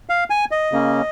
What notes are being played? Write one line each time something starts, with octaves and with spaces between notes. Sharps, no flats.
F5
G#5
D#5
C#3 A#3 C#4